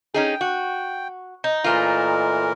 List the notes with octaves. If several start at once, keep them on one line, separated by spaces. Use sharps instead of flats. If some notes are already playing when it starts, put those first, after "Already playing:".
C#4 D#4 G#4 G5
F#4
D#4
A#2 E3 A3 F4 A#4